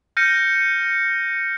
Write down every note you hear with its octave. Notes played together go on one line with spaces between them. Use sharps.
F6 G6 A#6 C#7 D#7